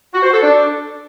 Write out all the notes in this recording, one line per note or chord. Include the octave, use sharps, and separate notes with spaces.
F#4
C5
A4
D4